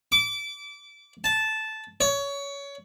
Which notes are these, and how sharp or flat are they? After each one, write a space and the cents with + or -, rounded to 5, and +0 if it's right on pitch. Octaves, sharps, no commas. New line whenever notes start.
D6 -25
A5 -10
C#5 +20